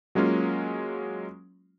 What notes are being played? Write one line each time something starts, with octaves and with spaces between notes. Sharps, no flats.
F#3 G#3 A#3 C#4 F4